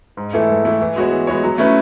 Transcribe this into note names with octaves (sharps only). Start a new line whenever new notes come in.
G#2
E3 A3 E4 A4
G#2
E3 A3 E4 A4
E3
G#3 B3 F#4 C#5
E3
G#3 B3 F#4 C#5
F#3
A3 C#4 E4 B4